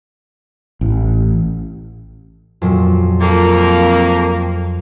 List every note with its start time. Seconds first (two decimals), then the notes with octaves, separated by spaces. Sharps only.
0.81 A1
2.62 F2 A#2 F#3
3.21 F2 A#3 A6